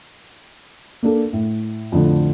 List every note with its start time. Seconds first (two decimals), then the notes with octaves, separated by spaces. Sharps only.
1.03 A#3 D4 A4
1.33 A2
1.92 F2 A2 D3